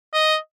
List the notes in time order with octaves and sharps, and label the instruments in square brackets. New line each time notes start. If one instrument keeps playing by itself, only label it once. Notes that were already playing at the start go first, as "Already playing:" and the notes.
[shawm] D#5